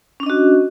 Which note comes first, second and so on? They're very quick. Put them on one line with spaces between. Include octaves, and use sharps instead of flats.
C#4 D4 D#5 F#4